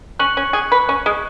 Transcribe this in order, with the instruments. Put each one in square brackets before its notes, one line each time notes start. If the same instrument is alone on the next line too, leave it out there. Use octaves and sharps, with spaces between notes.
[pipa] C#4 [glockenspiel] C#6 F#6 C#7 F#7
[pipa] C#4
G#4
B4
C#4
G#3